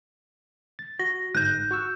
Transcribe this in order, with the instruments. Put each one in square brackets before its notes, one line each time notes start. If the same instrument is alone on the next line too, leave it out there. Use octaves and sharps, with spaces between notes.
[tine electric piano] A6
[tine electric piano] F#4 [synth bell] A#6
[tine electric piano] G1 G#2 A#6 [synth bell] F#6 G6
[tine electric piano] F#4 C#6 E6